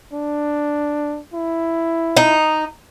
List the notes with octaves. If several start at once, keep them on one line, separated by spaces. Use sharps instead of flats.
D4
E4
D#4